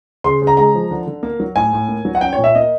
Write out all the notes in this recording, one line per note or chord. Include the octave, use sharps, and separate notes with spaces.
C#3 C6
C#3
A#5
G#3 A#5
F3
D3
D3
A#3
F#3
A2 G#5
A2
A#3
F#3
F#5
C#4 G5
A#2 C#5
E5
A#3 D#5